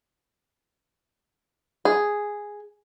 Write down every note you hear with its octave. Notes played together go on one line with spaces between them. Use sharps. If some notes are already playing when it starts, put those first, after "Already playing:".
G#4